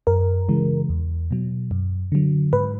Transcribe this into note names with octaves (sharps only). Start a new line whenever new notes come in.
F#2 A#4
C#3 E3 G#3
E2
B2 F#3
F#2
D3 F#3
G#2 B4